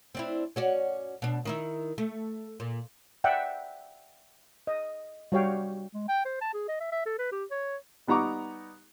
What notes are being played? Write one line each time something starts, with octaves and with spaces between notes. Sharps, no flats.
C4 D4 E4
C#4 F#4 D5
B2 D4
D#3 D#4 E4
A3
A#2
D5 E5 F#5 G5
D#5
G3 F#4 C#5 F5 G5
G#3
G5
C5
A5
G#4
D#5
E5
E5
A4
B4
G4
C#5
G3 B3 D#4 A#5 C#6 D6